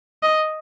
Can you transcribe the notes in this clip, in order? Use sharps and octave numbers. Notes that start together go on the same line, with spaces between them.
D#5